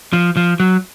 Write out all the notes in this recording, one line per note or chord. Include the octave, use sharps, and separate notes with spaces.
F3
F3
F#3